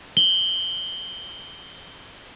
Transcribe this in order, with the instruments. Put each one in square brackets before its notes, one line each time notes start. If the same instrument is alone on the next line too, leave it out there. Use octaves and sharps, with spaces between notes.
[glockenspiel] F#7 G7